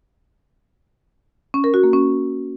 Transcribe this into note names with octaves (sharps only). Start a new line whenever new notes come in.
C#4
A#4
F#4
A#3
C#4